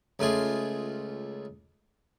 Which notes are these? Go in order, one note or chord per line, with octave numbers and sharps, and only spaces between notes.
C#2 A3 F4 G#4